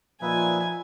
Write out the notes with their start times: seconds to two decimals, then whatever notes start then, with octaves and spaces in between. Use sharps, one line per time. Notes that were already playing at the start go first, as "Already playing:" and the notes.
0.22 A#2 F3 D#4 F4 B4 E5 G#5